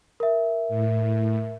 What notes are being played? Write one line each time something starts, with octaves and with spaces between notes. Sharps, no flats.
A#4 E5
A2